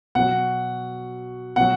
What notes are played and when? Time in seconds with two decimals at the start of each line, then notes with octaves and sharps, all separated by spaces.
0.15 B2 F#3 F#5
1.56 B2 F#3 F#5